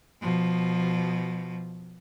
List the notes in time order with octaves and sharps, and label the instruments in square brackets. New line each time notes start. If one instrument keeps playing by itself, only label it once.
[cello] B2 F3